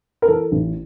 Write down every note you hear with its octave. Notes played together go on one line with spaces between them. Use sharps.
A#4
E3 A4
A1